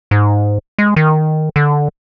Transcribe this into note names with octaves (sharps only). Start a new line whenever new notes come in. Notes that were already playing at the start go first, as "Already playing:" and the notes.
G#2
G#3
D#3
D3